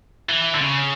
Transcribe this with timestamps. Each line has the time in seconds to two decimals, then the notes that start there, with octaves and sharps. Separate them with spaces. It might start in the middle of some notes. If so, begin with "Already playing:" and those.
0.29 E3
0.55 D3
0.61 C#3